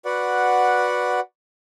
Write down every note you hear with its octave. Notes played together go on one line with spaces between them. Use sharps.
F#4 B4 D5 F#5